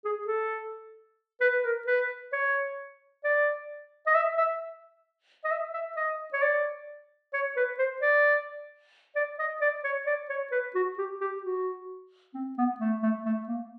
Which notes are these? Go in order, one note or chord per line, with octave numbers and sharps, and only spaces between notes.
G#4
A4
B4
B4
A#4
B4
C#5
D5
D#5
E5
E5
D#5
E5
E5
D#5
C#5
D5
C#5
B4
C5
D5
D5
D#5
D5
C#5
D5
C#5
B4
F#4
G4
G4
F#4
C4
B3
A3
A3
A3
A#3